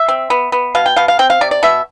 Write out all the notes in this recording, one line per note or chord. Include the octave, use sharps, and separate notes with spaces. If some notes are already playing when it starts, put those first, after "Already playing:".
Already playing: E5
C4
B3
B3
B2 F5
G5
B2 F5
F5
C4 G5
F5
C3 D5
D5
B2 E5